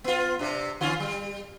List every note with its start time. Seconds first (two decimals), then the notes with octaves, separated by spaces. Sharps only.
0.04 B3 F4
0.39 C3 D4
0.81 D3 C#4 F4
1.00 G3